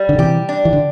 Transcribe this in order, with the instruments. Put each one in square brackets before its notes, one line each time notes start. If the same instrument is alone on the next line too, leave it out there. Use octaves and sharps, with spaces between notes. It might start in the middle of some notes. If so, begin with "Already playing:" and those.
Already playing: [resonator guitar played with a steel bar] G3
[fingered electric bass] D3
[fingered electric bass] C3 E3 [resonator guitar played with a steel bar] G4
[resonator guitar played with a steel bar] D4
[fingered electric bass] E3
D3